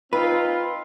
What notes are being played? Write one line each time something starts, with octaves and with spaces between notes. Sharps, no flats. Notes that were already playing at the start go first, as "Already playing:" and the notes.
C4 D#4 F4 B4